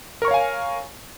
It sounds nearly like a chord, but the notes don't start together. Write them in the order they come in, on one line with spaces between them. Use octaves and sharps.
A#4 C#6 C#5 F5 G#5